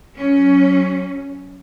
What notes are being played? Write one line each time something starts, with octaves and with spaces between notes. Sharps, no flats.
F#3 C#4